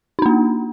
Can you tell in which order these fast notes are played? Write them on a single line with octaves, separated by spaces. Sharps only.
D#4 D4 A#3